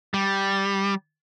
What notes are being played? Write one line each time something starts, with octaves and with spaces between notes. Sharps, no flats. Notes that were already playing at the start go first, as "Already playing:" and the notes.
G3